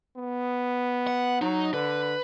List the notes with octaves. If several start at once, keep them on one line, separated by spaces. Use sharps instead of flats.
B3
F#5
F#3 D#4
D3 B4